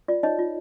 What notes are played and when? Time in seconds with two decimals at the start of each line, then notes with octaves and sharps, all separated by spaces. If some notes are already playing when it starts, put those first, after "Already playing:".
0.08 F4 D5
0.23 D#4 C#5 D#5
0.39 F4